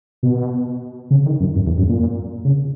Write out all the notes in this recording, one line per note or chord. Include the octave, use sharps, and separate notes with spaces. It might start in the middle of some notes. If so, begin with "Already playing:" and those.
B2
C#3
D#3
F#2
F#2
E2
F#2
A#2
C#3